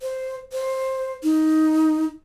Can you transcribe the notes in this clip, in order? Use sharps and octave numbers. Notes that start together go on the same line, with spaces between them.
C5
C5
D#4